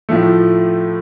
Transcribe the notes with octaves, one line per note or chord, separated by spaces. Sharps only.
A2 F3 A3